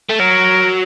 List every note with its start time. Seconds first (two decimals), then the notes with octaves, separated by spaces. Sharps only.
0.09 A3
0.19 F#3 A#4